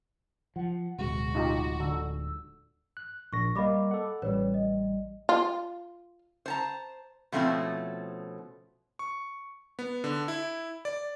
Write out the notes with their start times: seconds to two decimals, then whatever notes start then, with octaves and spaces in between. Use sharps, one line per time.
0.56 F3 F#5
0.98 D1 B2 G#3 F#4
1.35 D#4 F4 G4
1.80 D3 E6
2.97 F#6
3.33 A#1 C#6 A#6
3.55 G3 A#3 D#5 B5 D6
3.91 A4 F#5
4.22 A1 G3 B4 C#5
4.54 D#5
5.29 F4
6.46 C5 A5 A#5
7.32 B2 F3 A3 C4 C#4 E4
8.99 C#6
9.79 B3
10.04 D3
10.28 E4
10.85 D5